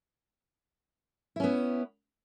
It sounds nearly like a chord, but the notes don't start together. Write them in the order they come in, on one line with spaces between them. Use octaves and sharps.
E4 C#4 B3